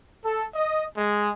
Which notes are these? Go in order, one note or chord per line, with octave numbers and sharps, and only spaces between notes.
A4
D#5
G#3